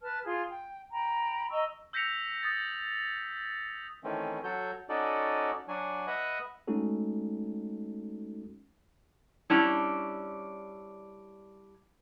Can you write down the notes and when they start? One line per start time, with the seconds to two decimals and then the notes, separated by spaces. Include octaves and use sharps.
0.02 B4 A5 F6
0.25 F4 G#4 C6
0.50 G5
0.91 G5 A#5 B5
1.50 D#5 A#5 C#6 E6
1.93 E6 G6 A#6 B6 C#7 F7
2.43 D#6 A6
4.04 D#3 E3 A3 C4 C#4
4.44 F#3 F#4 A4 C#5 G6
4.89 C#4 D#4 F#4 A4 D5
5.68 F#3 D4 F#4 G#5
6.07 B4 D#5 E5 F#5 D#6 F#6
6.67 G#3 A3 C#4 D#4 F#4 A4
9.50 G3 C#4 D4 E4